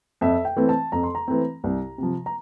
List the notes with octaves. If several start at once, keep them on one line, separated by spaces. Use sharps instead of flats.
F2 E5
G5
E3 A3 C4
A5
F2 A#5
C6
A#5
E3 A3 C4
C2
C3 F3
A#5